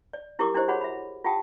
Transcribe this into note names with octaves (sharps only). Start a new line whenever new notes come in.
D5
D4 E4 G4 A#4 C#6 D6
D4 E4 G4 C5 D#5
D4 F#4 G#4 C#5 F#5 B5
E5 B5
F4 G4 F#5 G5 A5 D#6